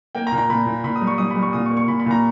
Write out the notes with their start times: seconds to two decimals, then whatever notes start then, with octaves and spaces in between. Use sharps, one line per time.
0.15 A#3 G5
0.27 A#5
0.32 A#2
0.38 A#5
0.49 A#2 B5
0.66 A#2
0.84 A#2 B5
0.96 D#6
1.01 G3
1.07 C#6
1.18 G3 D#6
1.31 B5
1.36 G3
1.42 C#6
1.53 A#2 D#6
1.66 C#6
1.70 A#3
1.77 C#6
1.88 A#2 B5
2.00 B5
2.06 A#2 A#5